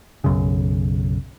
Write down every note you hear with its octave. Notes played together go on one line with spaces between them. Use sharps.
B1 F#2 C#3